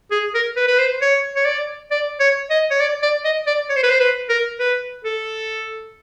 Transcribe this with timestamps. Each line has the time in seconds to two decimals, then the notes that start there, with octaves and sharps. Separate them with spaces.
0.11 G#4
0.34 A#4
0.56 B4
0.68 B4
0.79 C5
1.01 C#5
1.36 C#5
1.45 D5
1.91 D5
2.20 C#5
2.50 D#5
2.71 C#5
2.80 D5
3.03 D5
3.24 D#5
3.47 D5
3.69 C#5
3.76 C5
3.83 B4
3.91 C5
4.00 B4
4.29 A#4
4.60 B4
5.04 A4